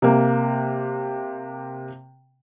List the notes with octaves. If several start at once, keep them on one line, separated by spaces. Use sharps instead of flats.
C3 A#3